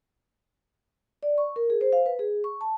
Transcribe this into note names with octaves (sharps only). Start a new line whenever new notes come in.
D5
C#6
A#4
G#4
C5
F5
B4
G#4
C#6
A5